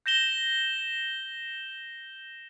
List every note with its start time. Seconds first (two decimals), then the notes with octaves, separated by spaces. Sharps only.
0.06 G6 A#6 E7 G7